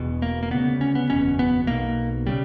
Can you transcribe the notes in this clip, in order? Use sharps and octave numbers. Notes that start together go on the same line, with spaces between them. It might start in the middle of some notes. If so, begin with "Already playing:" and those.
Already playing: E1 E2 B2
A#3
A#3
D2 C#3 B3
C#4
B3
F#1 E2 B2 C#4
B3
B1 B2 A#3
C#3 G3